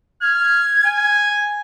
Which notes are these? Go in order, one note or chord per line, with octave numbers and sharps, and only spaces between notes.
F6 G#6
G#5